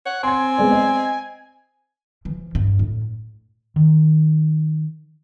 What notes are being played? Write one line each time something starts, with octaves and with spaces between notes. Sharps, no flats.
C#5 F#5
C4 G#5 C6 G#6
G#3 B3 D5
D#5
E3 F3
G2
A2
D#3